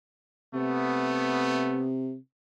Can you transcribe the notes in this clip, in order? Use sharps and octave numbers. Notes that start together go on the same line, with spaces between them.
C3 A3 B3